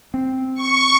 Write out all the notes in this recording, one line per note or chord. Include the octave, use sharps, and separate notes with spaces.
C4
C#6